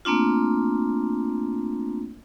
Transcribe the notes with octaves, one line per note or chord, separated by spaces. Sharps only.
A3 A#3 C4 D4 F4